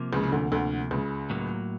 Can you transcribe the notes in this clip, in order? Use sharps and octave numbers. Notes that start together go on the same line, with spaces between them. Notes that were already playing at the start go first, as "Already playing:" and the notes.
Already playing: C3 F3 A#3
C#2 C#3
C#3
D2 D3
D2 D3
C#2 C#3
A2 F#3 A#3